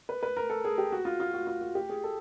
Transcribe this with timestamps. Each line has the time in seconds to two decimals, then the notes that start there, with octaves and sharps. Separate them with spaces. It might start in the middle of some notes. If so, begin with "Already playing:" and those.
0.09 B4
0.23 B4
0.37 A#4
0.50 A4
0.65 G#4
0.78 G4
0.92 F#4
1.05 F4
1.20 F4
1.34 F#4
1.47 F4
1.61 F#4
1.75 G4
1.89 G#4
2.04 A4